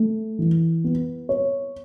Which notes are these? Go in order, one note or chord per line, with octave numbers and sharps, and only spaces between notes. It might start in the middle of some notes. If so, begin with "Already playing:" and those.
Already playing: A3
E3
B3
C#5